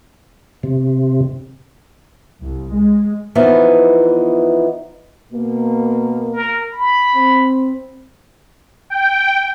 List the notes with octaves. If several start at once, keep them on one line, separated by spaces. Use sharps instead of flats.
C3
C2
G#3
E3 F3 B3 D#4
B2 A#3
A#4
B5
C4
G5